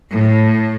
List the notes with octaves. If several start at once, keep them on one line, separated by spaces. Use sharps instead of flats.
A2